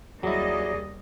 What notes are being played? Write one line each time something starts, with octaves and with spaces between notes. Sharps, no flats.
D#2 F#3 G3 E4 G#4 D5 D#5